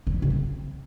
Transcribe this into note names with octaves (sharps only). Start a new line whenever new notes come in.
D#3
E3
C#3
C4